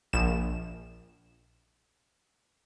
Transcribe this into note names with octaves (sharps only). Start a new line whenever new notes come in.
A#1 E7